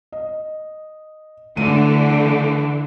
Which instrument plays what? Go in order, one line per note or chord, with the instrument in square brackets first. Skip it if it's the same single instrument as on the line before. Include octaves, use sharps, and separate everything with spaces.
[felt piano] D#5
[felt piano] D2 A3 D#7 [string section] D3 E3